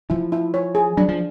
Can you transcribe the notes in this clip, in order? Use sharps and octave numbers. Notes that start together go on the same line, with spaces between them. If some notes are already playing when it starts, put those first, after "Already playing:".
F3 E4
E4
C#5
G#4
F#3 D4
F3